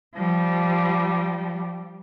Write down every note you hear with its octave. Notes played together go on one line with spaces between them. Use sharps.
F3 G3